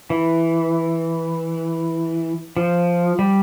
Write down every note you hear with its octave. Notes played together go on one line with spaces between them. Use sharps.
E3
F3
G3